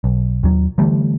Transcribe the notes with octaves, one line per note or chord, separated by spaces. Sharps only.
B1
D#2 F#3
D3 E3 G3 A3